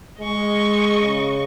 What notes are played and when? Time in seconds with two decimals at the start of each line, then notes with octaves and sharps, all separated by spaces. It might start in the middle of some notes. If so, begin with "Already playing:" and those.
0.20 G#3 D#5 C#6
1.01 C#3